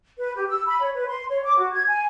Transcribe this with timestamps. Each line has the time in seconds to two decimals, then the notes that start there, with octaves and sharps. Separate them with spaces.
0.19 B4
0.35 G4
0.49 E6
0.66 B5
0.82 C#5
0.95 B4
1.07 C6
1.29 C#5
1.44 D6
1.58 F#4
1.72 G#6
1.87 G#5